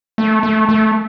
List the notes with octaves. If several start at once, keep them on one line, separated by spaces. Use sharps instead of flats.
A3
A3
A3